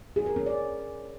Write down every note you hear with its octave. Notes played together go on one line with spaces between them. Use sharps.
G#4
A#4
C#4
D5